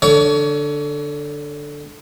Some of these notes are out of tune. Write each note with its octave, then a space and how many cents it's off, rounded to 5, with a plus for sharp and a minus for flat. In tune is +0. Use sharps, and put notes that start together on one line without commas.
D3 +0 C#5 +30 C#6 +40